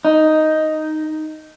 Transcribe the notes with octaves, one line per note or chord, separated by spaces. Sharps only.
D#4